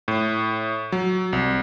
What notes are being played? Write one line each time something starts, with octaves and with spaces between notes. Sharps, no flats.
A2
F#3
C2